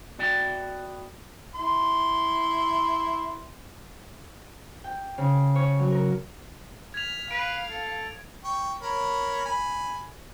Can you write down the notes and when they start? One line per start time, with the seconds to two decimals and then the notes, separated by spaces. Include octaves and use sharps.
0.19 B3 F#4 D5 E5 G5
1.55 E4 C6
4.84 G5
5.18 C#3
5.55 C#5
5.79 F#3
5.91 A#4
6.94 F6 G#6 B6 F7
7.31 B4 F5 D7
7.68 A4
8.45 G5 C#6
8.82 A#4 C#5 B5
9.46 G#5 B5